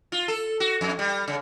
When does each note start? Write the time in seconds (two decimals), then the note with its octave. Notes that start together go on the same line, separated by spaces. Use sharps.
0.12 F4
0.28 A4
0.60 F#4
0.81 F2
0.99 G3
1.28 C#3